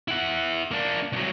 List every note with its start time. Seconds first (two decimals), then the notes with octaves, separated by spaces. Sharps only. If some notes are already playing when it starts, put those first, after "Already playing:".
0.08 E4 F#5
0.71 A#3 D4
1.12 C2 F#3